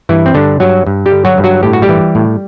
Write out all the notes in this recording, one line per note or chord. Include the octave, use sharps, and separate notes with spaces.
G2 E3 E4
C4
G2 D3 D4
G2 F#3 F#4
G2
G3 G4
D3
F#3 F#4
G2
F#3 F#4
A2 G4
F#4
G3 G4
E3
A2